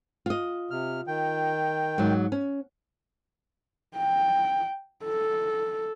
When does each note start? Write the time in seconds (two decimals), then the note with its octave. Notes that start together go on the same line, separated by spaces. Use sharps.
0.26 F4 D#5
0.71 C3 F6
1.07 D#3 G5
1.98 G#2 F#3
2.32 C#4
3.97 G5
5.05 A4